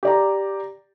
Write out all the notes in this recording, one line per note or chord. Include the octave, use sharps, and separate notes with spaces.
G4 D5 A#5